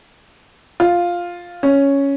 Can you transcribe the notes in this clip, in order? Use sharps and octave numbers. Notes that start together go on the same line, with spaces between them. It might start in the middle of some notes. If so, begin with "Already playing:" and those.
F4
C#4